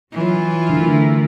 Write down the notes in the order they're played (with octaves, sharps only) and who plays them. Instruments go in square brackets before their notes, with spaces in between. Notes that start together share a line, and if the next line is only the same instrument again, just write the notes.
[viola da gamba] E3 F4 [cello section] F#3
[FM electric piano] D3 [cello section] A3 E4 A#4